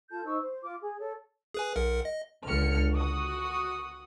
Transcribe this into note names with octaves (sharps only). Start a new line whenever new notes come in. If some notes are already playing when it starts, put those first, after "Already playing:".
F4 A4 A5 G6
D#4 C5 C#6 E6
C5
F4 D6
G#4
A4 C#5
G#4 B4 G#5
B1 A#4 F#5
D#5
C#2 D3 F6 C#7
F#4 D#6